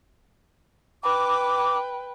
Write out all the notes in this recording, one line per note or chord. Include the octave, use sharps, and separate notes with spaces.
B4 G5 D6